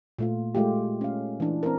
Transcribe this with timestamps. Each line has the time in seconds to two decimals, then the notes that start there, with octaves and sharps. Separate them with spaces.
0.18 A#2 A3 F4
0.55 G#3 A3 F4 G4
1.01 C#4 F5
1.40 E3 D4
1.63 C4 A#4